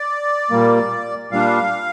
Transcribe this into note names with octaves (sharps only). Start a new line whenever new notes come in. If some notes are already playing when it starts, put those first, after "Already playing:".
Already playing: D5
A#2 G3 A#3
A#2 G3 D4 F5